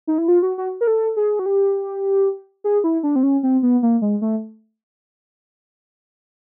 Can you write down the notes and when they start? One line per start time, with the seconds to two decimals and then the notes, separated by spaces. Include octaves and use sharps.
0.07 D#4
0.18 E4
0.28 F4
0.43 F#4
0.58 F#4
0.81 A#4
0.87 A4
1.17 G#4
1.39 F#4
1.46 G4
2.64 G#4
2.84 E4
3.03 D4
3.16 C4
3.23 C#4
3.43 C4
3.63 B3
3.83 A#3
4.02 G#3
4.22 A3